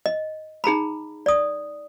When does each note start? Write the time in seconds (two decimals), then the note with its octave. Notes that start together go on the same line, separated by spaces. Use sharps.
0.06 D#5
0.64 D#4 G#4 A#5 B5
1.26 D5 D#6